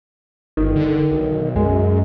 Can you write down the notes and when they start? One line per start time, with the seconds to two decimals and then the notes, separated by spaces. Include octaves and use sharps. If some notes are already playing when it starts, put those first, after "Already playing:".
0.57 G1 D#3
0.76 D3
1.11 B1
1.56 F#2 G#3